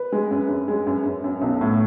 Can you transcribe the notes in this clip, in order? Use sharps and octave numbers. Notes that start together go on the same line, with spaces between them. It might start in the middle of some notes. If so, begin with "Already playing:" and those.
Already playing: B4
G#3
F#2
F#2
G#3
F#2
F#2
F#2
B1
A2